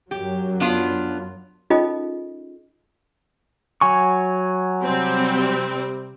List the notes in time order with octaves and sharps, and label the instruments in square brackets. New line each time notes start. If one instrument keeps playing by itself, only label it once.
[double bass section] F#2 F#3 [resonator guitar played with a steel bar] G4
[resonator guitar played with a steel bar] B3 D4 F4
[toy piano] C#4 D#4 F4 G#4 A4 D#5
[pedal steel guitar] F#3 G#5 C#6
[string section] C3 G3 C4